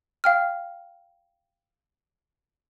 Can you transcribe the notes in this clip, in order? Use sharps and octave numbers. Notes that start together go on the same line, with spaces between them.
F5 G5 F6